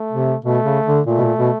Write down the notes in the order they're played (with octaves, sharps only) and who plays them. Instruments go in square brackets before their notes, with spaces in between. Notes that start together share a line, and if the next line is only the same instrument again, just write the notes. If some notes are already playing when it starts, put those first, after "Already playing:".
Already playing: [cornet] A3
[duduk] C3
[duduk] B2 [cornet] A3
[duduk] C#3
D3
[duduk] A#2 [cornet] A3
[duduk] B2
A#2
B2